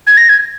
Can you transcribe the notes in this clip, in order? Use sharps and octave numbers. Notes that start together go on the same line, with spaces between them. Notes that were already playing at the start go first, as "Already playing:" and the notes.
G#6
A#6
G#6